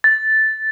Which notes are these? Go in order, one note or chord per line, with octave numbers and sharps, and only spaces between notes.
A6